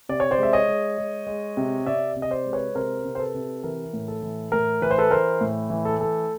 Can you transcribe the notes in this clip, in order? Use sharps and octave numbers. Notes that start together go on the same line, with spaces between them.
C3 D5
C#5
C5 D5
G#3 E5
C#5 D#5
G#3
G#3
G#3
C3
C3 D5 E5
C3
D#5
C5 D5
G#3
B4 C#5
C3 A#4 C5
C3
C5
A4 B4
C3
E3 A#4
A2
A4
E3
A2 A#4
E3 B4
C5
A4 B4
E3 A#4 C5
A2
E3
A4
A3 A4